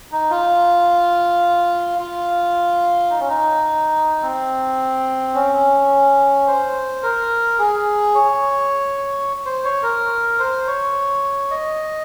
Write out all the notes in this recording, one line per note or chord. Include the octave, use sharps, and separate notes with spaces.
D#4
F4
F4
D#4
C#4
D#4
C4
C#4
C5
A#4
G#4
C#5
C5
C#5
A#4
C5
C#5
D#5